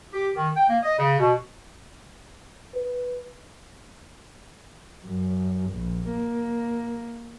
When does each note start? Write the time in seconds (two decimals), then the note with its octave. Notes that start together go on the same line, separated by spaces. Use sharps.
0.13 G4
0.36 D#3
0.56 G5
0.70 A#3
0.83 D#5
0.98 C#3
1.19 B2
2.75 B4
5.05 F#2
5.71 A#1
6.09 A#3